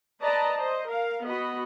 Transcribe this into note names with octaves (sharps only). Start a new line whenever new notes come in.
B4 D5 D#5 A5 A#5
C5 D#5
A#4 F5
B3 F#4 D#5 B5